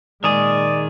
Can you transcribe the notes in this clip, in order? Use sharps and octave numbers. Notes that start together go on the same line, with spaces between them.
A#2 D#3 G#3 G#4 D5